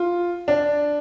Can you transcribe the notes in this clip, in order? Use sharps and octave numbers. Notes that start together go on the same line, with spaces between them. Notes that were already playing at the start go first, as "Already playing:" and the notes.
Already playing: F4
D4